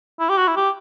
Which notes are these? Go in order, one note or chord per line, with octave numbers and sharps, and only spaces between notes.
E4
G4
F#4
E4
G4